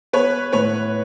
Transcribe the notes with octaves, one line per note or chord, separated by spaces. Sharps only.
B3 B4 C#5
A2 B4 C#5